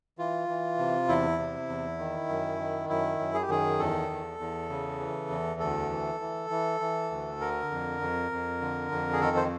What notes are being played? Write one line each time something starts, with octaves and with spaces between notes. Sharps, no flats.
E3 F4
E3
C3
E2 E4
C3
E2
D#3
F#2
D#3
F#2 E4
F#2
G#4
G4
D#3 G#4
E2 A4
E2
E2
C#3
E3
E2
D2 A4
E3
E3
E3
E3
D2
D3 A#4
F2
F2
F2
D3
F2
G#4
D#3 A4
C5